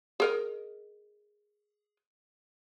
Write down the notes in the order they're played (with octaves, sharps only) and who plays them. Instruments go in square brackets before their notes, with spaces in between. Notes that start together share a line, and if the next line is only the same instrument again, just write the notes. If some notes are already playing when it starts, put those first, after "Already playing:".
[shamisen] G#4 A#4 D#5